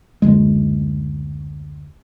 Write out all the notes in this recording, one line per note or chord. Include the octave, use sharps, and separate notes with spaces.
F#1 D2 G#3